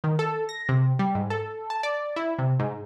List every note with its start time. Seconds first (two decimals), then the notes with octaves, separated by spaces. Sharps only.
0.04 D#3
0.19 A4
0.49 A#6
0.69 C3
0.99 G3
1.15 G#2
1.30 A4
1.70 A5
1.83 D5
2.16 E4
2.38 C3
2.60 G#2